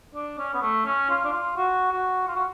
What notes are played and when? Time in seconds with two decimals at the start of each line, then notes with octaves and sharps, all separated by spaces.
0.14 D4
0.38 C#4
0.53 B3
0.62 A3
0.85 C#4
1.09 F4
1.25 D4
1.32 F4
1.57 F#4
1.92 F#4
2.27 F4
2.35 F#4